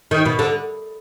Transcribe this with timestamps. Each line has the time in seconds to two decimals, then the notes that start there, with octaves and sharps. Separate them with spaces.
0.11 D#3
0.26 B2
0.39 D3